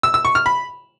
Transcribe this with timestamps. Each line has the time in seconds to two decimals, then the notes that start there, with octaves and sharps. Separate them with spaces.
0.03 E6
0.14 E6
0.25 C#6
0.35 F6
0.46 B5